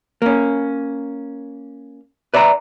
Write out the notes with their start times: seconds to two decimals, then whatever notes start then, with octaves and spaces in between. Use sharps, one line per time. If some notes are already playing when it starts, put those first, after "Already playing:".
0.22 A#3 C#4
2.34 B4 D5 E5 G#5 A#5